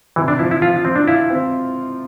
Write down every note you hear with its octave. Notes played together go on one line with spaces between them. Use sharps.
C3 E3
D4
F3 E4
E4
F3 F4
F3 C4
D4
E4 F4
C4